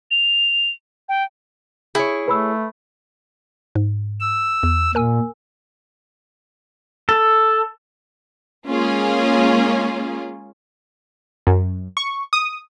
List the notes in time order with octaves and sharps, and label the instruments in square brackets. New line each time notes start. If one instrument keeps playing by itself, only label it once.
[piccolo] F7
G5
[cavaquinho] E4 [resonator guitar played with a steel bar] G#4 C#5
[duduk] A3 [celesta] B4 B5 E6
[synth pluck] G#2
[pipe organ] E6
[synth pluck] E2
[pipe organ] A#2 [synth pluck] A#4 G#5 E6
[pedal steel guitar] A4
[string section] G#3 A#3 C#4 F4 G#4
[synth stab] F#2
C#6
D#6